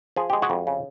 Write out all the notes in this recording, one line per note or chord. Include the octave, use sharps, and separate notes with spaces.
F3 G#4
G#3 G4
F#4 G#4
F2
C#3